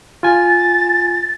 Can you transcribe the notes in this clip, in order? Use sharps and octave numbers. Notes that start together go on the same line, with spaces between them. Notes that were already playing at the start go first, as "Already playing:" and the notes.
F4 G#5 A6